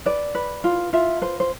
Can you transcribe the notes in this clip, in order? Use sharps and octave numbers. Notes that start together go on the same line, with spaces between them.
B4 D5
B4
F4
F4 E5
B4 C5
C5